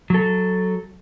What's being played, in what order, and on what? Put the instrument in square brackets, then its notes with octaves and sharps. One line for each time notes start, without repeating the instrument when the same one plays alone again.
[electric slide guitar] F#3 A4